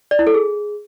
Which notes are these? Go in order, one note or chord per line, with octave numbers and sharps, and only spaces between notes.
D5
E4
A4
G#4